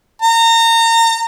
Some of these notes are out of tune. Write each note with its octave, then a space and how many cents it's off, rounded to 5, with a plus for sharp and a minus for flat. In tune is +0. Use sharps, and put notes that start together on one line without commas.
A#5 -30